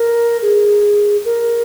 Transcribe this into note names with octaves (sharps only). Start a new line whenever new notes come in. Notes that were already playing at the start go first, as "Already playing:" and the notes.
Already playing: A#4
G#4
A#4